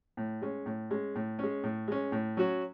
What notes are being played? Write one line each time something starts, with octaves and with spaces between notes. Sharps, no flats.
A2
G#3 C#4
A2
G#3 C#4
A2
G#3 C#4
A2
G#3 C#4
A2
F#3 C#4 F#4